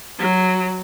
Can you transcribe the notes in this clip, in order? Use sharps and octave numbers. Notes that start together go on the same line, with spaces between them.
F#3